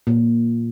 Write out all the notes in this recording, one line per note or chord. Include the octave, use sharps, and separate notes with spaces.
A#2